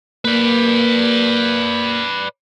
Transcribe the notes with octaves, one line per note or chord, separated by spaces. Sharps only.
A#3 B4 D5